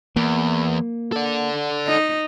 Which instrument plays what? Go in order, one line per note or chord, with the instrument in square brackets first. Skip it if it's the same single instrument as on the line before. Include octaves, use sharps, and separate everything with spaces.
[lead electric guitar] E2 [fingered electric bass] A#3
[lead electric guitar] A4 D5
[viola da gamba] D#4